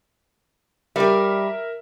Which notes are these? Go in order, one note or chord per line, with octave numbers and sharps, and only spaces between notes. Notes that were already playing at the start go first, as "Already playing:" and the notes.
G3 G4 A#4 E5